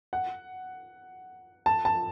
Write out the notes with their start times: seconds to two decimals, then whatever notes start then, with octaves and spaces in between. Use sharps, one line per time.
0.13 F#5
1.66 A5
1.85 A5